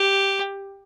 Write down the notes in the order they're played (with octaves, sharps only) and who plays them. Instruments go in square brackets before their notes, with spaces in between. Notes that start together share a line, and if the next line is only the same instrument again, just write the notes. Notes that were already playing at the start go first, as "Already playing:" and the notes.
Already playing: [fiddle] G4